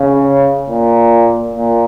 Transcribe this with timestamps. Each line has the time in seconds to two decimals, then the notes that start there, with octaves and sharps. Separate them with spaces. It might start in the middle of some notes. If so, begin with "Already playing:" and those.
Already playing: C#3
0.69 A#2
1.55 A#2